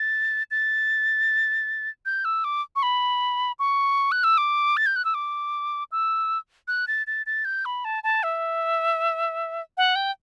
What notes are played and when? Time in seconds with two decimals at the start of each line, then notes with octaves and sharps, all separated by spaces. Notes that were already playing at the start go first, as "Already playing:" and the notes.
Already playing: A6
0.51 A6
2.06 G6
2.25 E6
2.44 D6
2.76 C#6
2.83 B5
3.59 C#6
4.12 F#6
4.24 E6
4.38 D6
4.77 A6
4.86 G6
4.96 F#6
5.05 E6
5.14 D6
5.92 E6
6.68 F#6
6.88 A6
7.07 A6
7.26 A6
7.45 G6
7.65 B5
7.85 A5
8.04 A5
8.23 E5
9.77 F#5
9.95 G5